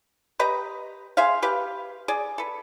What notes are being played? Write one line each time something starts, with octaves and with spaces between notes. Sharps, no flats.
G4 B4 D#5 A#5
G#4 C5 E5 F5
G4 B4 F5
G#4 D5
A4 B4